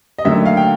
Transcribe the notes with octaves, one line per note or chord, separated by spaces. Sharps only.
D#5
D#2 D3 F#3 A3 E5
F5
G5